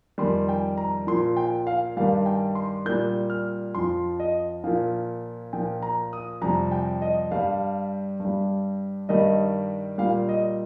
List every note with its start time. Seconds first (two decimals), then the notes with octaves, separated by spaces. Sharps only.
0.18 F2 D#3 G3 C6
0.49 G5
0.78 A#5
1.07 A#2 F3 C6
1.37 G5
1.67 F5
1.97 G2 D#3 G3 F5
2.26 G5
2.55 C6
2.85 A#2 G3 G6
3.30 F6
3.75 F2 F3 C6
4.20 D#5
4.64 A#2 F3 F5
5.53 A#2 F3 G5
5.82 A#5
6.13 D#6
6.42 F2 C3 G3 A#5
6.72 G5
7.02 D#5
7.31 G2 G3 F5
8.20 G2
8.25 G3
9.09 G2 D#3 G3 D#5
9.98 A#2 G3 F5
10.29 D#5